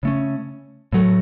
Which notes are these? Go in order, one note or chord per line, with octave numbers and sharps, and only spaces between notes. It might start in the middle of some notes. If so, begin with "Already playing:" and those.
C#3 A3 C#4
A2 F#3 A3